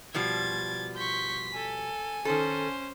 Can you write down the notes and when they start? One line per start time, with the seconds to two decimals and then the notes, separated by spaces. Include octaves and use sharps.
0.14 B2 F3 G3 G#6 A6
0.96 C6 C#6 G6 B6
1.55 A4 G#5
2.25 D#3 C#4 A4 C5